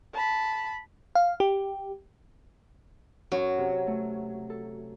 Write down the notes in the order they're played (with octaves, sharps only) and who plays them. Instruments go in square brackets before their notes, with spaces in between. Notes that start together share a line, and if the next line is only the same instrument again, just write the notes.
[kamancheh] A5 B5
[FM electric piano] F5
G4
[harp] F#2 [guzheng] F#3
[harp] C3
A3
A4